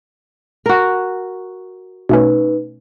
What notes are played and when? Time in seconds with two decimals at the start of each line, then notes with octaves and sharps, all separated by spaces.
0.66 F#4 A#4
2.09 B2 A3 C#4 D#4 B4